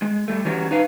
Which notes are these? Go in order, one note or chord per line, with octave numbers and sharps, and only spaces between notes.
G#3
G3 A3
E3 F#3 G3 C#4 F#4 G4
D#4 B4 F5